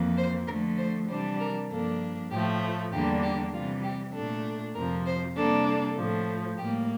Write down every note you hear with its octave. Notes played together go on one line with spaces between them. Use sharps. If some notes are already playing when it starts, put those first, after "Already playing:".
Already playing: F2 E3 A#3
C5
D3 F3 A3 A#4
C5
C3 E3 G3 D4 C5
A#4
G2 F3 A#3 D4 A4
A2 F3 A3 G4
E2 D3 G3 A#3 D4 G4
G4
C3 E3 G3 F4
G4
A#2 A3 D4 A4
F2 C3 F3 A#4
C5
C3 G3 A#3 D4 A4
A4
A2 F3 A3
A2 G3 A#3 G4